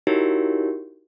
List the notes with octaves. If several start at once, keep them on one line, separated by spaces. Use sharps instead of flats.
D#4 E4 F#4 G4 A#4 C#5